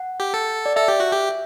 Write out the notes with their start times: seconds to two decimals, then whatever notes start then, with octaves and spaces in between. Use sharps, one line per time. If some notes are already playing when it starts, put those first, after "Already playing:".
Already playing: F#5
0.20 G4
0.34 A4
0.66 D5
0.76 A4 E5
0.88 G4
1.00 F#4
1.11 G4